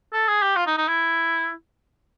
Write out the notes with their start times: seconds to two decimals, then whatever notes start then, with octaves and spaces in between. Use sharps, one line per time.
0.13 A4
0.28 G#4
0.42 G4
0.56 F4
0.67 D#4
0.77 D#4
0.88 E4